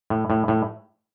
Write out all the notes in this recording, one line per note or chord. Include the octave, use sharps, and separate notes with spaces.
A2
A2
A2